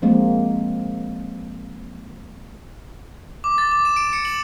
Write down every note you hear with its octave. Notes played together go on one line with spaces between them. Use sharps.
F3 G#3 A#3 C4
D6
A6
D6
E7
D7
C#7
F#7